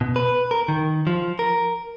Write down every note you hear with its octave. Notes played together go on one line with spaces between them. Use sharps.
B2
B4
A#4
D#3
F3
A#4